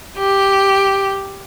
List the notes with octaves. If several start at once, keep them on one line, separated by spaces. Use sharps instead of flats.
G4